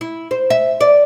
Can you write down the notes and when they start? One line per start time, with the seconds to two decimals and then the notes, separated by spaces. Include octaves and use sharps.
0.01 E4
0.31 C5
0.50 E5
0.81 D5